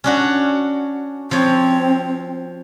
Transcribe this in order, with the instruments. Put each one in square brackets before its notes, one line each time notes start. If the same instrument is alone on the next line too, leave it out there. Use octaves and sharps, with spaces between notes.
[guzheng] C#4 D4 F#4
[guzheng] F3 C#5 [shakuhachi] C4